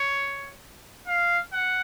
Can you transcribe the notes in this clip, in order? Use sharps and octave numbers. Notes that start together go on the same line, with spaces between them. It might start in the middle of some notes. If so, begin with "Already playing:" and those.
Already playing: C#5
F5
F#5